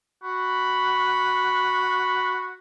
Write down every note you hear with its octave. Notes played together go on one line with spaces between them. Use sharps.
F#4 B5